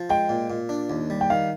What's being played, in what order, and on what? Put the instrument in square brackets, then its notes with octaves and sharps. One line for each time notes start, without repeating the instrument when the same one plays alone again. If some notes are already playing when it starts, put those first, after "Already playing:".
Already playing: [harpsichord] F3
[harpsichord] G#3 [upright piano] G5
[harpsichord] A#2
A#2
D4
D#2
G3
[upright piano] G5
[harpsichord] D#3 [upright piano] F5